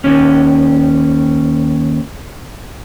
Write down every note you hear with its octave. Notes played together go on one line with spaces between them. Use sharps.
D#2 C#4